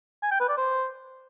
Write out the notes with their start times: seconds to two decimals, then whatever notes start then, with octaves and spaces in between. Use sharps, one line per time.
0.23 G#5
0.32 G5
0.40 B4
0.49 D5
0.57 C5